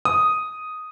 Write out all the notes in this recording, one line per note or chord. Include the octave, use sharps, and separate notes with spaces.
D#6